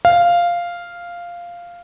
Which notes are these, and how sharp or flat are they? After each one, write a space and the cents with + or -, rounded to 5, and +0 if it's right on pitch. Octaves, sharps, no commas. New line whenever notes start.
F5 -5